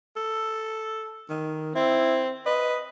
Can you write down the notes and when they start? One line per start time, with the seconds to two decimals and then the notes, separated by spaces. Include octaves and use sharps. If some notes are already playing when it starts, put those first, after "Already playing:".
0.16 A4
1.30 D#3
1.75 C4 E4
2.46 B4 D#5